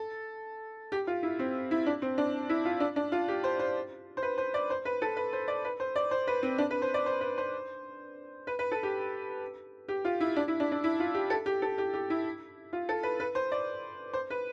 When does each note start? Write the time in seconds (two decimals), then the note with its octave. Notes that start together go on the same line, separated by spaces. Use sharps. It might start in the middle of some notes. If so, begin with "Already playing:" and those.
Already playing: A4
0.92 G4
1.07 F4
1.23 E4
1.39 C4
1.71 E4
1.86 D4
2.02 C4
2.18 D4
2.49 E4
2.65 F4
2.80 D4
2.96 D4
3.12 F4
3.28 G4
3.44 C5
3.59 C5
4.17 C5
4.22 B4
4.38 C5
4.54 D5
4.70 C5
4.85 B4
5.02 A4
5.17 B4
5.33 C5
5.48 D5
5.65 B4
5.80 C5
5.96 D5
6.11 C5
6.27 B4
6.43 C4
6.58 D4
6.71 B4
6.82 C5
6.94 D5
7.06 C5
7.21 B4
7.38 C5
8.47 B4
8.59 B4
8.72 A4
8.83 G4
9.88 G4
10.05 F4
10.20 E4
10.36 D4
10.48 E4
10.60 D4
10.72 D4
10.84 E4
11.00 F4
11.14 G4
11.30 A4
11.46 G4
11.62 A4
11.78 G4
11.94 G4
12.10 E4
12.73 F4
12.89 A4
13.03 B4
13.20 B4
13.35 C5
13.52 D5
14.13 C5
14.30 B4